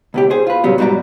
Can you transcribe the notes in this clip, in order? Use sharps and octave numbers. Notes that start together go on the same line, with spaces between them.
C#2 B2 G4
G#4 C5
F4 B4
A#2 C#3 F#3 G3 B3
G#2 B2 G3 F#4 D5 A#5